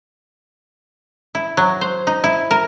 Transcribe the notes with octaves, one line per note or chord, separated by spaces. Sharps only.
E4
F#3
C5
D#4
E4
A#4